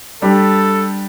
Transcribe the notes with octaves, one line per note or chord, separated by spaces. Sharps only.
G3 D4 G4 A4